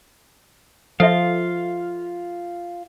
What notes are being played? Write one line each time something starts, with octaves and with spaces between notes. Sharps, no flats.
F3 F4 A4 E5 F5